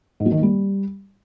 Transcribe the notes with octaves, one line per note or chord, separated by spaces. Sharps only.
G#2
F#3
D#3
A#3
G3